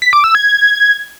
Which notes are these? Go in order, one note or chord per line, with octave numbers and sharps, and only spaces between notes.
B6
D6
E6
G#6